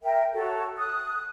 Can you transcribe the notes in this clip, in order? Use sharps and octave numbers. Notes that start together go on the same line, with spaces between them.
A#4 E5 G5
F#4 A4 C#5
D#6 F#6